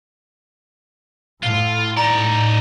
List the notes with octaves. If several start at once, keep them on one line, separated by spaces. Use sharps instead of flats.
A2 F4 G7
D#4 D5 A#5